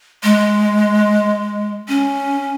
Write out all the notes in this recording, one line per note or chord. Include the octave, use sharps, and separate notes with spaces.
G#3
C#4